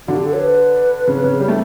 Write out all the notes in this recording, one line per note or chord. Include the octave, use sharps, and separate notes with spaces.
D3 F#4
G4
A4
C#5
B4
C#3
C#3
G3
A3